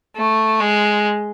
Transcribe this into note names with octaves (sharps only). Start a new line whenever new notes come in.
A3
G#3